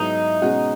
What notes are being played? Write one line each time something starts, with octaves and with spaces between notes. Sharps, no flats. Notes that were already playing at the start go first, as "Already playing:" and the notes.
Already playing: G#2 F#3 B3 D#4 E4
B2 G#3 C#4 F#4